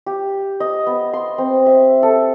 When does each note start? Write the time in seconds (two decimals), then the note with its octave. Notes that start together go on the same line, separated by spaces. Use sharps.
0.06 G4
0.60 D#5
0.87 B3
1.13 C6
1.38 C4
1.66 E5
2.03 A4